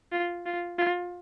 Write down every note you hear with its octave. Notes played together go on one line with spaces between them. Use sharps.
F4
F4
F4